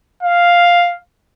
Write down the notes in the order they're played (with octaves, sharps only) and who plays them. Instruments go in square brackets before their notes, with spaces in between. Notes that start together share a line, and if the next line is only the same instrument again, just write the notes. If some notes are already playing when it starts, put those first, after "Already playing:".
[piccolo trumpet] F5